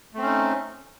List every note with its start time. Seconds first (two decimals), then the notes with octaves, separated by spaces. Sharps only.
0.14 A3
0.18 C4
0.22 C#4
0.26 D#4